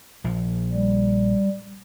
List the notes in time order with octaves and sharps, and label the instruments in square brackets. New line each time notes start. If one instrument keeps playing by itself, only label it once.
[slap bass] A#1 F3
[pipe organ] G3